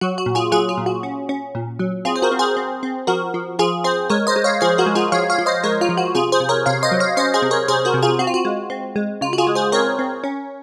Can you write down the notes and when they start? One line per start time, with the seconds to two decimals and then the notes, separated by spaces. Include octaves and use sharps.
0.01 F#3 F#4
0.18 F#4
0.26 A#2
0.35 F4 G#4
0.52 F#3 F4 G#4
0.69 F4
0.77 A#2
0.86 F#4
1.03 C#4
1.29 C#4
1.55 A#2
1.79 F#3
2.05 C4 F4 G#4
2.16 C5
2.22 F#4 A#4
2.32 C4
2.39 G#4 C5
2.57 C4
2.83 C4
3.07 F3 F#4 A#4
3.34 F3
3.59 F3 F4 G#4
3.84 C4 G#4 C5
4.10 G#3 A#4 C#5
4.27 C5 D#5
4.36 G#3
4.44 C#5 F5
4.61 F3 G#4 C5
4.78 F#4 A#4
4.86 G#3
4.95 F4 G#4
5.12 F3 C#5 F5
5.30 C#5 F5
5.38 F3
5.46 C5 D#5
5.64 G#3 A#4 C#5
5.81 F4
5.89 F3
5.97 F#4
6.15 C3 F4 G#4
6.32 G#4 C5
6.40 C3
6.49 A#4 C#5
6.66 C3 C#5 F5
6.83 C5 D#5
6.92 F#3
7.00 C#5 F5
7.17 C#4 C5 D#5
7.34 G#4 C5
7.42 C3
7.51 A#4 C#5
7.68 C3 G#4 C5
7.85 F#4 A#4
7.94 C3
8.02 F4 G#4
8.19 C4 F#4
8.27 F4
8.34 F#4
8.45 G#3
8.70 C4
8.96 G#3
9.21 C#3 F4
9.33 F#4
9.38 F4 G#4
9.47 G#3
9.55 G#4 C5
9.72 C4 A#4 C#5
9.99 C4
10.24 C#4